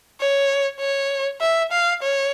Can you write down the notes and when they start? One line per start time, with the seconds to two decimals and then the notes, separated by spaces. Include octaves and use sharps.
0.21 C#5
0.80 C#5
1.41 E5
1.72 F5
2.03 C#5